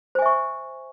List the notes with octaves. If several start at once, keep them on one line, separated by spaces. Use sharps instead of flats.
C5 E5 G#5 C#6